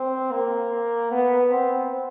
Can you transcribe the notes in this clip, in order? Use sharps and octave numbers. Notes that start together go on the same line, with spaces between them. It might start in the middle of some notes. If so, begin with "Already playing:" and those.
Already playing: C4
A#3
B3
C4